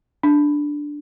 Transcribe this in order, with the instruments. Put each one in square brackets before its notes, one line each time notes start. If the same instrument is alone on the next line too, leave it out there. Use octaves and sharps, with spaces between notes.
[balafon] D4